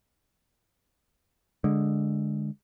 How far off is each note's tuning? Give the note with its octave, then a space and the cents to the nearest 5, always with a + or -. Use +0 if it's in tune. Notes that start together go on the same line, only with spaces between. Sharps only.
D3 +0 G#3 -5